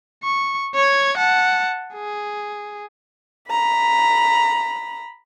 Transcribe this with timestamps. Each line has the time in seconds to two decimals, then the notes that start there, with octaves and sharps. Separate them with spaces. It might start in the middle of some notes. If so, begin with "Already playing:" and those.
0.24 C#6
0.75 C#5 G#6
1.18 F#5 A5
1.94 G#4
3.50 A#5 B5